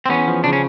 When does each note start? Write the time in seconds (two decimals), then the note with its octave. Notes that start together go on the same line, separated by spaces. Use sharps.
0.06 C4
0.09 E2 B3 C#4
0.28 F3
0.44 C#3 D4
0.53 C#4